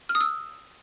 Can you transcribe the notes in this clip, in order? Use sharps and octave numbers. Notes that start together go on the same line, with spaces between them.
F6
D#6
E6